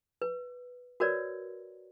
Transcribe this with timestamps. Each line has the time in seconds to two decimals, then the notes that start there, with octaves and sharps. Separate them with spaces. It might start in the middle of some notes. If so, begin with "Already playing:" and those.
0.22 B4
1.00 F#4 A#4 B4 C#5 D5